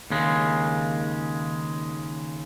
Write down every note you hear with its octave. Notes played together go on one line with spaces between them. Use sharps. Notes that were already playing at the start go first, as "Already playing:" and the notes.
D#2 C#3 G#3